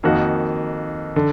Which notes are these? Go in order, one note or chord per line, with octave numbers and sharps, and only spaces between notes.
F2 D#3 A#3 D#4 F#4
D3